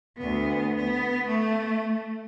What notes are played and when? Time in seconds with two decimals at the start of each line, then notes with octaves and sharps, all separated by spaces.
0.18 D2 B3
0.75 B3
1.27 A3